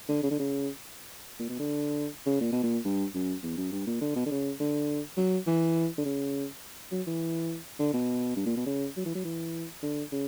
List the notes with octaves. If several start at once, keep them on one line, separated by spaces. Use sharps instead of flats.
D3
C#3
D3
C#3
A#2
B2
D3
C#3
A#2
B2
A#2
G2
F#2
E2
F#2
G2
A#2
D3
B2
D3
C#3
D3
F#3
E3
D3
C#3
F#3
E3
D3
B2
G2
A#2
B2
C#3
F#3
E3
F#3
E3
D3
C#3